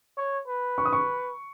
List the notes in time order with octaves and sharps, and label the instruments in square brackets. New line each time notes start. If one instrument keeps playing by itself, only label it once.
[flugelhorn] C#5
B4
[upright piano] C#6
D#6
C#6